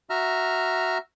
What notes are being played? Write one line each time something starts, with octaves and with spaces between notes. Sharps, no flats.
F#4 E5 A#5 F6